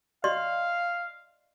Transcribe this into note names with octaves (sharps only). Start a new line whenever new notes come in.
D5 D#5 F5 C6